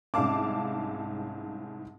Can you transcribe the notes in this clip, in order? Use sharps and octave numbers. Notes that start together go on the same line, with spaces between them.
C2 G#2 C#4 F5 A5 D6